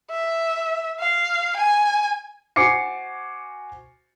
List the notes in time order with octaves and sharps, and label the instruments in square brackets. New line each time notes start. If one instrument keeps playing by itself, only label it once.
[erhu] E5
F5
G#5
[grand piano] F#4 C5 G#5 D6 C7 C#7